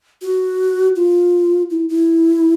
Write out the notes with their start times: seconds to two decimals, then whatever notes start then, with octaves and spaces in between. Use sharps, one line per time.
0.22 F#4
0.96 F4
1.70 E4
1.89 E4